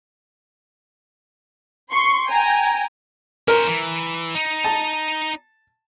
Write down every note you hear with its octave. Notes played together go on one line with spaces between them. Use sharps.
C6 C#6
G5 G#5 A#5
C#4 A#4 C5
E3
D#4
A5